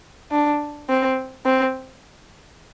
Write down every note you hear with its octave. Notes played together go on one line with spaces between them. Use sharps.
D4
C4
C4